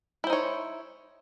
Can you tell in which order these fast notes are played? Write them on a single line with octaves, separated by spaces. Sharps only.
E4 C5 D#4 C#5